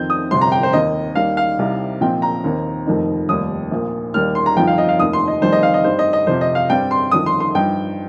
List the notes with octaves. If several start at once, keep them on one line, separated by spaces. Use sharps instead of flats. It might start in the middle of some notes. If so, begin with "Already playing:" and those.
Already playing: F2 D#3 C4 G6
D#6
G1 F2 C3 C6
A#5
G5
C5
D#2 D#3 C4 D#5
D#2 D#3 G3 F5
F5
C2 C3 G3 D#4
A#1 A#2 F3 C4 D#4 G5
A#5
D#2 D#3 C4
F1 F2 D#3 A#3 D#4
F1 D#2 D#3 G3 D#6
A#1 A#2 A#3
D#2 D#3 G3 A#3 F6
C6
A#5
G1 F2 F3 C4 D#4 G5
F5
D#5
F5
F1 D#2 D#3 D#6
C6
D#5
F1 F2 D#3 G3 C5
D#5
F5
D#5
G2 G3 D#4 C5
D#5
D#5
F2 C3 F3 C5
D#5
F5
G2 G3 C4 G5
C6
G1 F2 D#3 D#6
C6
C6
G2 F3 D#4 G5